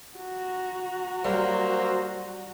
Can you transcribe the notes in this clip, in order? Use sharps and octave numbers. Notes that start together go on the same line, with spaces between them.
F#4 A#5
F#3 G3 A#3 C5